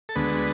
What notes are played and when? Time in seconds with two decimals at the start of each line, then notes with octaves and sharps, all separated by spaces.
0.09 A4
0.16 D2 D3 G#3 B3 B4